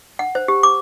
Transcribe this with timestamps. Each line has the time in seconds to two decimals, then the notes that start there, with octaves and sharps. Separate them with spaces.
0.19 F#5
0.35 C5
0.48 G4
0.63 D6